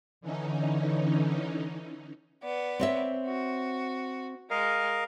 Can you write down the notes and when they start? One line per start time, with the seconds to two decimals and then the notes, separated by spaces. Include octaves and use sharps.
0.21 D3 E3 C#4 D#4
2.43 B3 D5
2.79 C4 C#5 E5
3.27 F#4
4.50 G#3 A#4 D#5 F5